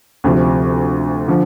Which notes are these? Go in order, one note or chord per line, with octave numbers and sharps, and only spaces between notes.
D2 C3 F3
D3 F3